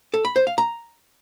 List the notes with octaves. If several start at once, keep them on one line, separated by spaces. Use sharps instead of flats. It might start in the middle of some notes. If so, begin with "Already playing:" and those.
A4
B5
C5
F5
A#5